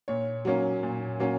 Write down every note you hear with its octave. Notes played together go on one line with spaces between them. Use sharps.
A#2 C#5
F#3 A#3 C#4
A#2
F#3 A#3 C#4